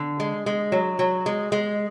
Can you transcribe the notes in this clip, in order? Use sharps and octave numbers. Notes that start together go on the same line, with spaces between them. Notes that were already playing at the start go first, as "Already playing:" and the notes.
Already playing: D3
G#3
G#3
F#3
F#3
G#3
G#3